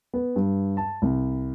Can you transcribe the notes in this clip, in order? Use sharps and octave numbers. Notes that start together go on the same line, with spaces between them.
B3
G2
A5
C2